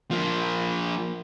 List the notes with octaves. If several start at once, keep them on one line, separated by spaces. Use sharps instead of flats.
F3 A#3